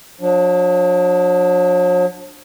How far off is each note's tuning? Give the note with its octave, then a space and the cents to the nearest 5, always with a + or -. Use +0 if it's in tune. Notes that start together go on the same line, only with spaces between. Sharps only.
F#3 -45 D4 +0